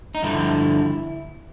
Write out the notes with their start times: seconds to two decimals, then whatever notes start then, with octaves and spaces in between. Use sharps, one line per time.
0.15 D#4
0.23 G2 D3 F3 E4